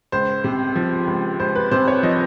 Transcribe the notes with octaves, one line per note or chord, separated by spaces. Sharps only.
C#2 C5
C3
F3
C#2
C#2 C5
B4
C3 C5
C#5
F3 D#5